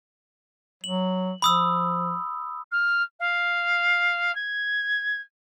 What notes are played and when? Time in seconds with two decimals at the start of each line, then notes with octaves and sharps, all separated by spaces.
0.84 F#3 F#7
1.42 F3 B5 D#6 E6
2.71 F6
3.19 F5
4.35 G#6